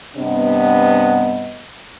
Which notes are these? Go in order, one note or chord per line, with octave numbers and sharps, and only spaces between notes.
G2 C3 B3 D4 B4 D#5